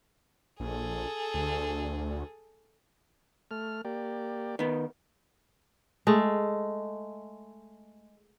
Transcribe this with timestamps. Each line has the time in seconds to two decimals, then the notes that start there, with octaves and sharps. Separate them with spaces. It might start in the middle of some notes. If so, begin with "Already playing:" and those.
0.60 A#1 G#4 A4
1.34 D2
3.51 A3 F6
3.85 A#3 G4 D5
4.59 D#3 B3
6.07 G#3 A3